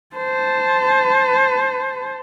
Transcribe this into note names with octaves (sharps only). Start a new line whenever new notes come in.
C5 A5